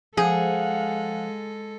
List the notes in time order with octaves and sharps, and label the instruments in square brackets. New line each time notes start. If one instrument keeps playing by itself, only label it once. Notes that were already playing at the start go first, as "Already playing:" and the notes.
[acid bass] F3 [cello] G#3 A4 [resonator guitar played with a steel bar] G#4 [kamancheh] F5 F#5